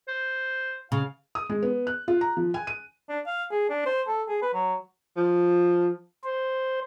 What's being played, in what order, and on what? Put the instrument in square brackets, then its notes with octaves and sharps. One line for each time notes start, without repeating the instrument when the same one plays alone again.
[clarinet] C5
[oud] C#3 [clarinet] F5
[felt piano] D#6
G#3
B3
F#6
F4
A#5
F3
G#5
D#7
[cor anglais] D4
F5
G#4
D4
C5
A4
G#4
B4
F#3
[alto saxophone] F3
[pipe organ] C5